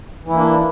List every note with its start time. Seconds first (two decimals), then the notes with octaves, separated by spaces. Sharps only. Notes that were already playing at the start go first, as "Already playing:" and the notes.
0.24 E3
0.29 E4
0.33 A#3
0.38 D4